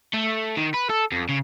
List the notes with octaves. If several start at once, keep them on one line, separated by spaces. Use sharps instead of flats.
A3
D#3
B4
A4
F2
C#3